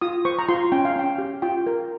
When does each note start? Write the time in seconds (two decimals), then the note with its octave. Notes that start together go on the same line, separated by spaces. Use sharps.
0.01 F4 D#6
0.25 C5 C#6
0.39 A#5
0.48 F4 C6
0.72 C#4 G5
0.85 F5
0.96 C#4 G5
1.18 G4
1.42 F4 G5
1.66 A#4